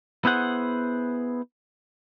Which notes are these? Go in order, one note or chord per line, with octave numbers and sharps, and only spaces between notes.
B3 E4 G#4 C5 F#5